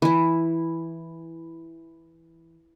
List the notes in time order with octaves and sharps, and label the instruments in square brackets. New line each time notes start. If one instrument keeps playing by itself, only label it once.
[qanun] E3 E4